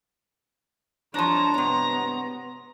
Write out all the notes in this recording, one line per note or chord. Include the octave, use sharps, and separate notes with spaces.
G2 F3 G#3 D4 C#5 A5 A#5
C3 B3 C#5